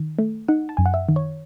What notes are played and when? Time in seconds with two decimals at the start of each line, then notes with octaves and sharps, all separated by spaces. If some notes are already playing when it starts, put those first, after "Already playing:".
Already playing: D#3
0.19 A3
0.48 D#4 F#5
0.69 A5
0.77 F#2 G#5
0.86 F#5
0.94 E5
1.09 D#3
1.16 C#5